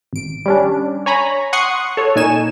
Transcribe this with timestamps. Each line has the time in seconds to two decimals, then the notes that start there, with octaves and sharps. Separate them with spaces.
0.13 G#1 D7
0.46 G3 C#4 D4
1.06 C#5 G#5 A#5 B5
1.53 F#5 C6 C#6 D#6 F#6 C#7
1.97 A4 C#5
2.16 A#2 D#4 G#5 E7